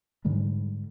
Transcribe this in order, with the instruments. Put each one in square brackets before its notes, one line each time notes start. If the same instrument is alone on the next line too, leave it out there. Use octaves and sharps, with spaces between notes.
[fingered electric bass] G#2 D3 G3 G#3